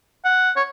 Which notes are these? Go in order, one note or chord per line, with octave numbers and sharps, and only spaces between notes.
F#5
C#5